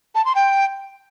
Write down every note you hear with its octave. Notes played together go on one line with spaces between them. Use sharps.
A5
C6
G5